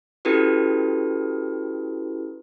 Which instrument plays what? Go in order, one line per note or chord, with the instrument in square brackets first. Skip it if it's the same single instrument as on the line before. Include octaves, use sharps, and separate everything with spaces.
[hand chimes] C#4 E4 F#4 G4 A4 B4